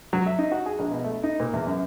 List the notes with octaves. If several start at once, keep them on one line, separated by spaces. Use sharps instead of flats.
F#3
E5
D#4
F#4
G#4
A#1
B2
A3
D#4
A#2
E2
F#2